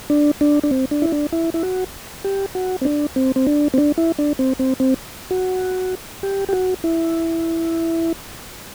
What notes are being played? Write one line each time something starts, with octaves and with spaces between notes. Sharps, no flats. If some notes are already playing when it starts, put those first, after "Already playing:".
D4
D4
D4
C4
D4
E4
D4
E4
E4
F#4
G4
F#4
C4
D4
C4
C4
D4
C4
D4
E4
D4
C4
C4
C4
F#4
G4
G4
F#4
E4